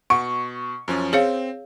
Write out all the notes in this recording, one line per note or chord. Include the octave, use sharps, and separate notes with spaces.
B2 F#5 C#6
F#2 F3 C#4
C4 G#4 C#5 F5